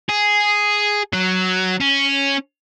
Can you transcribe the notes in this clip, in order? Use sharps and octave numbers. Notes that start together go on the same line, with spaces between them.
G#4
F#3
C#4